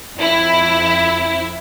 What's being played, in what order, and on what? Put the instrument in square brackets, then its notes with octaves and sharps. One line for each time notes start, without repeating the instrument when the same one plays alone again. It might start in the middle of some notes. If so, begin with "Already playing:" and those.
[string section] F2 E4